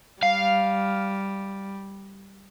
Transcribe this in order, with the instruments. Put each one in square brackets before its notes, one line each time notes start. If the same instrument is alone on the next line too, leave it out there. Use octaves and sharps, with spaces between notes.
[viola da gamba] G3 [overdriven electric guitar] F5